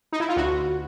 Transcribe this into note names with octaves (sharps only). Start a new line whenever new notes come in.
D#4
E4
F4
D2 F#4